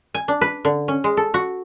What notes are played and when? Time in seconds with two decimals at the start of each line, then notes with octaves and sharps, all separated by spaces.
0.15 G#5
0.28 D4
0.41 B4
0.65 D3
0.88 C#4
1.04 G#3
1.17 A4
1.34 F#4